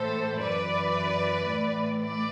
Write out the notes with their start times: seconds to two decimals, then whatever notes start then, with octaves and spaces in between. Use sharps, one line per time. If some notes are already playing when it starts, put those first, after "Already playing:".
Already playing: A2 E3 A4 C5
0.40 F#2 E3 B4 D5
1.47 A2 E3
2.00 B4 D5